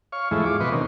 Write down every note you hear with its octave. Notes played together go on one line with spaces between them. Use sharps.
C#5 F5 C#6
E2 G#2 F3 G#3 A3 E4
F4 D6
B2 B4 D#5 C6 C#6
D#3 A#3 C4 C#4